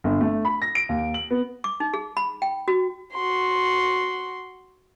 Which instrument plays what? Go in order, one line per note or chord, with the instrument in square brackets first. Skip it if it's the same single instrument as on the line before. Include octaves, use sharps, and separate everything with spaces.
[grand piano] G1
A3
B5
A#6
D7
D#2
F#7
B3
[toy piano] D6
D#4
G#4
B5
G5
F#4
[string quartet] F#4 C6